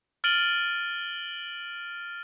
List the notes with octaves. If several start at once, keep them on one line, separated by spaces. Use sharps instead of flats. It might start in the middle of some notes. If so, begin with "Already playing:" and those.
F6 A6 D7 D#7 F#7 G7